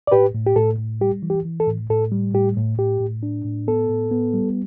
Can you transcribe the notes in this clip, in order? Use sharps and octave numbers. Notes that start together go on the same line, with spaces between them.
D5
A2 G4 B4
A2
G4
A2 A4
A2
G3 G4
E3
G4
E3
A4
A2
A2 A4
G3
A2 G4
A2
A2 G4
A2
D4
A2
B3 A4
A2
B3
G3